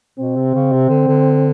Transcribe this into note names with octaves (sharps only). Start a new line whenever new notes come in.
B2 C4
C3
C#3
C3
D3
D3